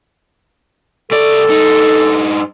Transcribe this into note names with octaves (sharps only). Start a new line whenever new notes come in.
C2 A4 D5
G2 D#4